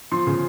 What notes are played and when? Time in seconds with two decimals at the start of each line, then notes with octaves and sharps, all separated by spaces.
0.12 F3 C6
0.27 C#3